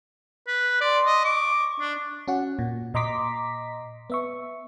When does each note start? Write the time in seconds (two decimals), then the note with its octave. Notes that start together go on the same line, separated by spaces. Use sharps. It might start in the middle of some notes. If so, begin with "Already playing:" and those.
0.48 B4
0.81 D5 C6
1.06 D#5
1.25 C#6 D6
1.80 D4
2.28 C#4 F#4 F#5
2.59 A#2
2.94 A#2 D#5 A#5 C6 D6 B6
4.10 B3 E5 C#6